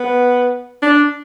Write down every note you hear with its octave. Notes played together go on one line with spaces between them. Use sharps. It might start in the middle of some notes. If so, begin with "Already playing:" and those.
Already playing: B3
D4